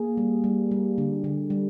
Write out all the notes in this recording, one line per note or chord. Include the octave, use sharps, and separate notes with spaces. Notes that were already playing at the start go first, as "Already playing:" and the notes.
Already playing: A#3 G#4
G3
G3
G3
D3
D3
G3